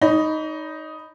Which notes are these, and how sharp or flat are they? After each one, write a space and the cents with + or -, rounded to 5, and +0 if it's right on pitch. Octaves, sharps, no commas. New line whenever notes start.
D#4 +0 C#5 +45 B5 +0